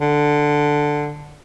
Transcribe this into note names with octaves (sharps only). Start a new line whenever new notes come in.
D3